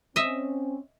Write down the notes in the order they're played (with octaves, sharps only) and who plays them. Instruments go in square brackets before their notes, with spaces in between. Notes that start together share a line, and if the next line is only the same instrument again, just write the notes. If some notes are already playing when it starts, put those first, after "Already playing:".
[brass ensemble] C4 C#4 [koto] D#5 E5